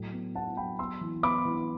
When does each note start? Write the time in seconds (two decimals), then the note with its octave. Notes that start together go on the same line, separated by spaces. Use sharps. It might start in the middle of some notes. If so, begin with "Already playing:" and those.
Already playing: A2 F#3
0.13 B3
0.35 B3 F#5 A5
0.57 F#3 G5 B5
0.79 B3 C6 E6
1.01 E3
1.23 B3 B5 D6
1.45 E3